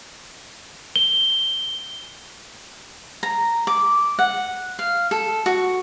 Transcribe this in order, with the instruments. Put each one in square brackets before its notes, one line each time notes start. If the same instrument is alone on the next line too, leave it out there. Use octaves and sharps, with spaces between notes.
[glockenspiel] G7
[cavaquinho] A#5
D6
F#5
F5
A4
F#4